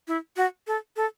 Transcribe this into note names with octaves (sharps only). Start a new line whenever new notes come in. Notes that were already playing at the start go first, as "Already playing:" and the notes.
E4
F#4
A4
A4